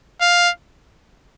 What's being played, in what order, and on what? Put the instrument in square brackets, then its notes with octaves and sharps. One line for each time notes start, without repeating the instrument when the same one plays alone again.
[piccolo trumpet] F5